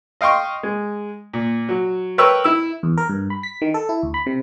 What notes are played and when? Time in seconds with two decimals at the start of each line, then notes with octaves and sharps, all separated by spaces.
0.21 D#5 F5 G5 C6 C#6
0.63 G#3
1.34 A#2
1.69 F#3
2.18 A#4 B4 C#5 G5 E6
2.44 E4 E6
2.83 E2
2.98 A#4
3.09 G2
3.30 B5
3.43 B6
3.62 D#3
3.74 A4
3.89 E4
4.03 D2
4.14 B5
4.26 C3